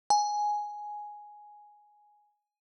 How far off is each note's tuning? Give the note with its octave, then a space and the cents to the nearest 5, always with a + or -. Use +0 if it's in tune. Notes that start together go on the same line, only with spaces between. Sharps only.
G#5 +5